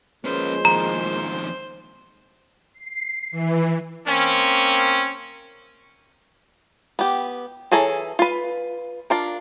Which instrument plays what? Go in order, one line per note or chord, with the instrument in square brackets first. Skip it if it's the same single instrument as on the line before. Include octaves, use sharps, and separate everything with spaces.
[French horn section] F3 G#3 A#3 [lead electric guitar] C#4 B4 [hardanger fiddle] C5
[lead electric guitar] F2 D#3 [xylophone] A#5
[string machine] C7
E3
[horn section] A#3 C4 C#4
[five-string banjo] B3 G4
E3 G#4 A4 C#5 A#5
F4 B4
D4 F4 A#4